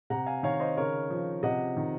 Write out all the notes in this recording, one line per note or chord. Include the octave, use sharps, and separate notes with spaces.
C3 F#5 A#5
F5 G#5
D#3 C#5 F5
C5 D#5
C#3 A#4 C#5
F3
C3 D#5 F#5
D#3